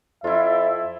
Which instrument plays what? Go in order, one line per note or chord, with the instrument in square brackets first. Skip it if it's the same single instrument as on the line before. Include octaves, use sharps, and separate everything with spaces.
[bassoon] F2 [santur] E4 F4 [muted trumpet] E5